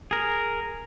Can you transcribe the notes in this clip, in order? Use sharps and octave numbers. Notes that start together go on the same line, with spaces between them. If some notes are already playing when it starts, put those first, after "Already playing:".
G#4 A#4